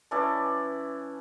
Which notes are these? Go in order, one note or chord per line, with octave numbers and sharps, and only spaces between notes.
E3 C#4 A4 D5